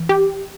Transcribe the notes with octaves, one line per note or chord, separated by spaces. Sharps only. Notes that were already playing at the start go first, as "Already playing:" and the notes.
Already playing: E3
G4